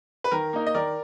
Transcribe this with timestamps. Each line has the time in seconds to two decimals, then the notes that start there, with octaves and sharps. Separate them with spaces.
0.24 B4
0.31 D#3 A#4
0.53 A#3 D#4
0.67 D#5
0.74 D#3 A#4 D5